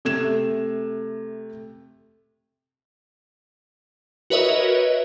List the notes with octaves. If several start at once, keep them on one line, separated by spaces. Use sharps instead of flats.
C3 A3 G#6 E7
F#4 A#4 B4 C#5 D#5 E5